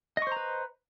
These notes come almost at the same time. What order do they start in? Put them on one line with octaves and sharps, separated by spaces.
D#5 C#6 C5 A#5 B4